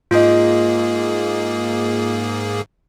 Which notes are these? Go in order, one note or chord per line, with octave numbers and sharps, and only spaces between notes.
G#2 A#3 F4 G#4 D#5